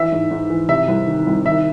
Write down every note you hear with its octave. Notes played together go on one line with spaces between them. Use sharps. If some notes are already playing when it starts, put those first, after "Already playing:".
Already playing: E3 E5
G#2
G#2
E3
C3 E5
C2
D#3
C2
D#3 E5